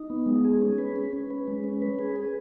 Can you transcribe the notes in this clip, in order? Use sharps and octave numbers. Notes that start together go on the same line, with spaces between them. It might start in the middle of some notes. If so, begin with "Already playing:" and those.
Already playing: D#4
B3
G#3
G#4
C#4
B4
C#4
C#4
B4
G#3
C#4
B4
G#4
G#4